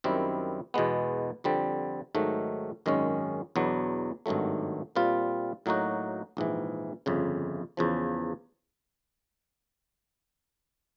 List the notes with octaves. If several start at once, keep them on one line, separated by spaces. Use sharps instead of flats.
F#2 D#3 G3 C4 E4
E2 B2 G#3 B3
F2 D3 G3 C4
G#2 D#3 F#3 A3
G#1 F#2 D#3 G#3 C#4
E2 B2 F#3 B3 D4
G#1 G2 D#3 F#3 A3
A#2 G3 C4 F4
A2 F#3 A#3 D#4 F#4
A#1 G#2 E3
G1 F2 C#3
E2 C#3 F3